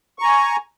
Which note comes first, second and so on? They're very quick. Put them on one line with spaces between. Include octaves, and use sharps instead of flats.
C#6 A#5 G#5